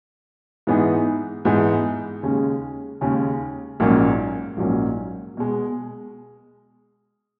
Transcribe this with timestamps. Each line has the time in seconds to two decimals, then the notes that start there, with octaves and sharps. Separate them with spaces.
0.67 G#2 E3 B3 D#4 G#4
1.45 G#2 E3 B3 D#4 G#4
2.23 D#2 C#3 G#3 C#4
3.01 D#2 C#3 G#3 C#4
3.80 A#1 G#2 F#3 A#3 C#4
4.57 A#1 G#2 F#3 A#3 C#4
5.37 B2 G#3